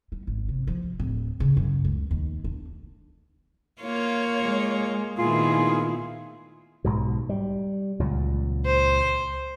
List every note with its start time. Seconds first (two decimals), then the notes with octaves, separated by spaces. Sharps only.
0.12 G3
0.27 G#1
0.49 C3
0.67 F3
1.00 D1
1.40 C#3
1.57 F#2
1.85 C#2
2.11 D#2
2.44 D4
3.82 A#3 F4 C#5
4.42 G#3
5.19 A#2 D#3 A3 B3 E4 F4 G#4
6.84 B1 G#2 B2
7.29 G3
7.99 C#2 A#2 F#3
8.65 C5